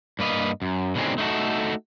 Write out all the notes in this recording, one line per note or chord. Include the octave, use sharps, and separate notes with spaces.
G2 A#3 B4 D#5
F#2
B2 D3 D#3 G#3 C4 C#4
A3 D#4 E4 F#4 A4